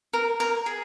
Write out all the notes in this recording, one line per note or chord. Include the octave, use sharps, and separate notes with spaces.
A#4
A#4
G#4